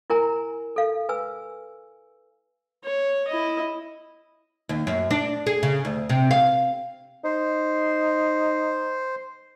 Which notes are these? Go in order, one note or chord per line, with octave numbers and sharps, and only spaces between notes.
E4 A#4 G#5 A#5
A4 F5
B4 G#5 E6
C#5
E4 D#5
D#2
F#2
D4
G#4
C#3
D2
C3
F5
D#4 C5